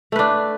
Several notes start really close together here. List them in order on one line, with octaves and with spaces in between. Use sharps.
A3 B4 D4